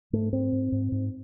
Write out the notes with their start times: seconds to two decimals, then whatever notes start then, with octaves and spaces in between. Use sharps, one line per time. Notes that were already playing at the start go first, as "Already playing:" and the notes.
0.13 G#2 A3
0.32 G#2 C4
0.52 G#2
0.72 G#2
0.92 G#2